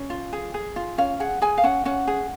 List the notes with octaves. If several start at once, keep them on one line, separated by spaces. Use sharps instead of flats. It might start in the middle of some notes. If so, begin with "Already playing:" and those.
Already playing: C#4
F4
G#4
G#4
F4
C#4 F5
G#4 F#5
G#4 G#5
F5
C#4 F#5
C#4 F#5
G#4